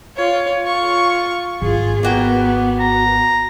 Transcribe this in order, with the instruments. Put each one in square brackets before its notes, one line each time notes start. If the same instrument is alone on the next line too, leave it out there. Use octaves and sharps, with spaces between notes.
[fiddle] F4 C#5
F4 C#6
[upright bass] G#1 [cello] F4 G#4
[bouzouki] A#3 F#4 G5 [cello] B3
[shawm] A#5